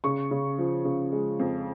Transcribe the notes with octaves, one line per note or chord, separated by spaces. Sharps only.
C#3 C#6
C#3
F3
C#3
G#3
F2